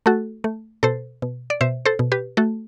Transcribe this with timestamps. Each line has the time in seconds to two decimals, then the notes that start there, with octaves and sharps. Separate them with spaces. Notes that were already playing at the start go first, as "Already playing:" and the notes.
0.06 A3 F#4 A4
0.44 A3
0.83 B2 A4 C5
1.22 B2
1.50 D5
1.61 B2 C5 E5
1.86 A4 C5
1.99 B2
2.12 G4 B4
2.37 A3 F#4 A4